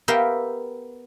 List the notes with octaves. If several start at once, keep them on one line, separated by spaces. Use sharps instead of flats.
B3 G4 A#4 E5 F5 G5